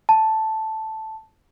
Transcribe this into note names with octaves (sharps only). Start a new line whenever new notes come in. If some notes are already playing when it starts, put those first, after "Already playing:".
A5